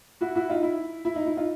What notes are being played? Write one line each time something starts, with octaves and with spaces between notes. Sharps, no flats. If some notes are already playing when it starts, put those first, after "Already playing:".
E4 F#4
E4 F#4
D#4 F4
E4
E4
D#4
E4
D#4 F4